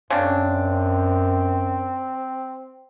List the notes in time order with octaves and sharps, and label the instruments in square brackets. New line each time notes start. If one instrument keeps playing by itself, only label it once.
[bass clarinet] F#2 [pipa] C#3 D4 [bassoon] C4